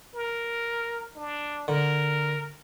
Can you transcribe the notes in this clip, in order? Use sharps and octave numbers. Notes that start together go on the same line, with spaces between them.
A#4
D4
D3 A#4